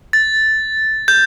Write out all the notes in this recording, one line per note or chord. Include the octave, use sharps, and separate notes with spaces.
A6
G6